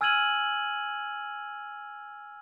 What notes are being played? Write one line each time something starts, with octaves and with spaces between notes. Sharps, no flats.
G#5 E6 F6 G#6 D#7 F#7